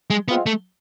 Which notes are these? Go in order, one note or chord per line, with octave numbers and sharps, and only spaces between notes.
G#3
G#3 B3 C4 F4
A3